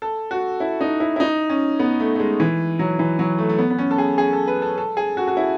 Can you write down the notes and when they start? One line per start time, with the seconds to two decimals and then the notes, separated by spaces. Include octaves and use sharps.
0.02 A4
0.31 F#4
0.60 E4
0.81 D#4
1.00 E4
1.16 E4
1.20 D#4
1.50 C#4
1.79 B3
2.00 A3
2.15 A3
2.20 G#3
2.40 E3
2.79 F#3
2.99 E3
3.19 F#3
3.38 A3
3.49 A3
3.58 B3
3.71 B3
3.78 C#4
3.91 A4
3.98 G#4
4.18 G#4
4.33 A4
4.48 B4
4.62 A4
4.78 A4
4.97 G#4
5.17 F#4
5.28 F#4
5.37 E4